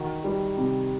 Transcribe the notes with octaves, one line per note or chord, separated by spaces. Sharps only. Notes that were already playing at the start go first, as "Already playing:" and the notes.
Already playing: D#3 F#4
G3
C3